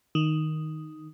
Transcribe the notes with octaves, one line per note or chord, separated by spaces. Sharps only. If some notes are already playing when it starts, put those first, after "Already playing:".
D#3